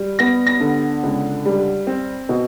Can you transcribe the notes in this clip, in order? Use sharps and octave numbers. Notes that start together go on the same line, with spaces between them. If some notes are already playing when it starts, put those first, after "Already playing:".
Already playing: G3
B3 A#6
A#6
D3
C#2
G3
C4
B2